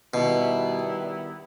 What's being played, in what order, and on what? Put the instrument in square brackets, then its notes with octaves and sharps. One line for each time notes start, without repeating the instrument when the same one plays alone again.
[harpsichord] B2 [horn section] D#3 G3 B3 E4